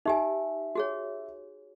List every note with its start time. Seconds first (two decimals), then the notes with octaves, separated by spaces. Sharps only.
0.06 D#4 G4 E5 G#5
0.75 F#4 G#4 C#5